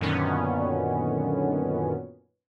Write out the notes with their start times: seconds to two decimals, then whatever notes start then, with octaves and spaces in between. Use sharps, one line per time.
0.01 F#2 A#2 D3 D#3 B3 C#4